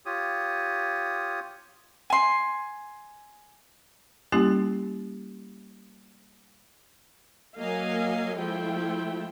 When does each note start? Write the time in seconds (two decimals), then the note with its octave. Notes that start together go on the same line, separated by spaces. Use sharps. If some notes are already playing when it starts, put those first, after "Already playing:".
0.06 F4 G4 C#5 D#6
2.10 G#5 C6
4.32 G3 A#3 C#4 E4 G4 G#5
7.58 F#3 A#3 D#5 F5 G#5
8.37 F3 G#3 A3 E4 G5